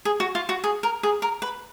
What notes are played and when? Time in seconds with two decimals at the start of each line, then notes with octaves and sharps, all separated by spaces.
0.05 G#4
0.20 F#4
0.35 F4
0.49 F#4
0.64 G#4
0.83 A#4
1.03 G#4
1.22 A#4
1.42 B4